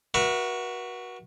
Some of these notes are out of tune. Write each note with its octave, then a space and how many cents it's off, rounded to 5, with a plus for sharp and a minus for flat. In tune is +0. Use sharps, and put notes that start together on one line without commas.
F#4 +0 B4 -45 E5 +10